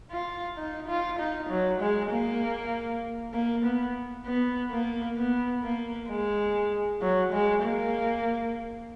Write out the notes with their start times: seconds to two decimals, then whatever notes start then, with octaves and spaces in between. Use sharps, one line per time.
0.11 F4
0.58 D#4
0.88 F4
1.19 D#4
1.49 F#3
1.81 G#3
2.11 A#3
3.34 A#3
3.64 B3
4.25 B3
4.71 A#3
5.17 B3
5.63 A#3
6.10 G#3
7.02 F#3
7.32 G#3
7.63 A#3